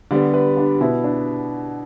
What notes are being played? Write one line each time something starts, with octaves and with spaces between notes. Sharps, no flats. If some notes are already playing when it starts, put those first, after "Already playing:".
D3 G3 B3 D5
B4
D4
B2 B3 E4
D4